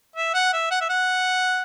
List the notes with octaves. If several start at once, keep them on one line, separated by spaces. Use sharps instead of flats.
E5
F#5
E5
F#5
E5
F#5